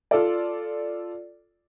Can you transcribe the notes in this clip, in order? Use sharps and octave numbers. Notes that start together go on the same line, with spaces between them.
F4 A4 D5